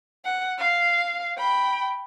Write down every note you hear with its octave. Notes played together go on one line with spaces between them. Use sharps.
F#5
F5
G5 B5